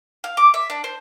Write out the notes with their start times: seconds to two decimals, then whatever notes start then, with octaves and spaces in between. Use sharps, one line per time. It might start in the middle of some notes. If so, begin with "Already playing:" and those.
0.24 F5
0.37 D6
0.54 E5
0.70 D4
0.84 C5